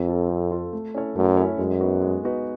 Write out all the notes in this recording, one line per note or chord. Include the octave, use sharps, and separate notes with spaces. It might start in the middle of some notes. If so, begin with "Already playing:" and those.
Already playing: F2 C4
F4 A4
C4
F4 A4
A3
C#4 E4 A4 C#5
F#2 A3
C#4 E4 A4 C#5
F#2 G#3
B3 D#4 F#4 B4
G#3
B3 D#4 F#4 B4